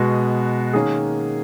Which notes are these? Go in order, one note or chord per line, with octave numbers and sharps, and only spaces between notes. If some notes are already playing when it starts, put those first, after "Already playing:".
Already playing: B2 G#3 B3 F#4
D#3 A#3 C#4 G#4